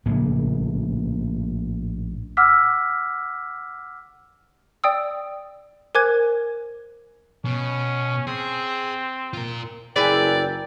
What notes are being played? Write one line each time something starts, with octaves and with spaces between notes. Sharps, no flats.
A#1 A2 C#3 A#3
F#5 D6 E6 F6 B6
D5 G5 D#6 E6
A#4 C5 G#5 D6 F#6 G#6
B2 C#4
C4 G#4
F4 A#4
F#1 E4 G#4 A#4 B4 D5 G5